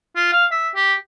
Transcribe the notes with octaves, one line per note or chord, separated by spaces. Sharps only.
F4
F5
E5
G4